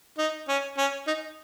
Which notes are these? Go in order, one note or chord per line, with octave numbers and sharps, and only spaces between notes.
D#4
C#4
C#4
D#4